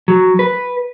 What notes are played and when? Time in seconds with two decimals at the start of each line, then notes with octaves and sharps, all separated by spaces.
0.08 F#3
0.39 B4